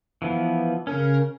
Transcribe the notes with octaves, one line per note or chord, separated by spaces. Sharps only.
E3 F3 B3
C#3 C#4 A#4